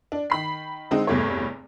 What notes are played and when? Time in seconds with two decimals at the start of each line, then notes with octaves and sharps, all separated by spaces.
0.12 D4
0.30 D#3 B5 C7
0.91 D3 G#3 C4 D#4
1.07 F1 E2 G2 A3 C#5